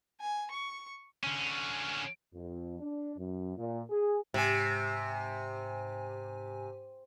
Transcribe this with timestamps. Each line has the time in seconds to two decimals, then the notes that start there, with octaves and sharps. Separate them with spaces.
0.20 G#5
0.51 C#6
1.23 D3 C#4
2.32 F2
2.79 D4
3.17 F#2
3.57 A#2
3.89 G#4
4.34 G#2 C3 G4 G#5